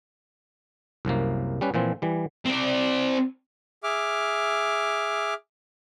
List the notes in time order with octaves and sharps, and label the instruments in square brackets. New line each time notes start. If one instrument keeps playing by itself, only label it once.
[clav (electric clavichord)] C2 F#2 C3 A#3
G3 C#4 B4
A#2 E3 F3 C4
E3 G3
[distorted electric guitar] C4 D5
[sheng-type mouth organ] G#4 E5 D6 F6